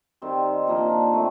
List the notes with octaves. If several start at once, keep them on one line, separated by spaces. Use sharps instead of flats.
D#3 G3 C4
A#2 F3 A#3 D4
E3 A3 C4